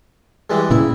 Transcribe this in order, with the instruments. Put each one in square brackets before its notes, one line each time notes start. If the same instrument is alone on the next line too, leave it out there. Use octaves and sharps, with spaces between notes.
[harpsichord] E3 G3 G#3
[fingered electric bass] A#2 C#3 [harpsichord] E4